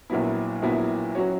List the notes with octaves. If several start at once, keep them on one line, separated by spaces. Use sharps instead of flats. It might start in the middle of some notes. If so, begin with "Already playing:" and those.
A#1 A#2 F#3 B3 E4
A#1 A#2 F#3 B3 E4
F#3 C#4 F#4 C#5